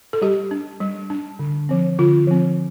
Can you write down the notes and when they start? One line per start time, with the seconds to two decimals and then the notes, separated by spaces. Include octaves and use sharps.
0.13 A4
0.22 G3 G4
0.51 D4
0.81 G3
1.10 D4
1.39 D3
1.69 F3 C4
1.98 D3 F4
2.27 F3 C4